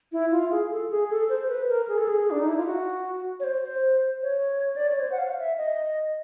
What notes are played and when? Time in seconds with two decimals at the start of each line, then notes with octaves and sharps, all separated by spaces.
0.12 E4
0.32 F4
0.51 G#4
0.71 A4
0.90 G#4
1.10 A4
1.29 C5
1.48 B4
1.68 A#4
1.88 G#4
1.98 A4
2.09 G#4
2.31 D4
2.39 D#4
2.48 E4
2.57 F4
2.66 F#4
3.40 C#5
3.44 C5
3.63 C5
4.22 C#5
4.76 D5
4.88 C#5
5.00 C5
5.12 F#5
5.19 F5
5.39 E5
5.58 D#5